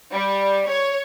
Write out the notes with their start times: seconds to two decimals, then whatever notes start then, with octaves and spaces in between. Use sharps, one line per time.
0.13 G3
0.68 C#5